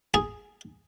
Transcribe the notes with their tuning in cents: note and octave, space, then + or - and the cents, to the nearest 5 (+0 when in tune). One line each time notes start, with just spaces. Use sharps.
G#4 +0 G#5 +0